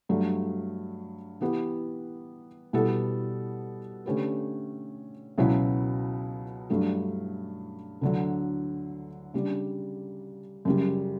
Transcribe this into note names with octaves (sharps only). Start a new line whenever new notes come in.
G2 F#3 A3
E3 B3 E4 G4 B4
B2 G3 B3 E4 A4
D3 A3 C#4 G4 B4
C#2 B2 F#3 C#4 E4
G2 F#3 A3 D4 A4
D2 D3 F#3
C#3 G3 D4
F#2 C#3 G3